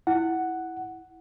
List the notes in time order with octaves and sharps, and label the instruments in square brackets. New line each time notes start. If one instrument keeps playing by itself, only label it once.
[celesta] E4 [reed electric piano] F#5